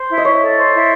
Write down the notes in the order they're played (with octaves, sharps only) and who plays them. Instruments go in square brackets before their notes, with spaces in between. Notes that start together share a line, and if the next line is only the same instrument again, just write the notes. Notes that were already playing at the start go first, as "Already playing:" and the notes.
Already playing: [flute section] C5
E4
[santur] D#5
[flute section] E4 [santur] C#5
[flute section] A4
C5
E4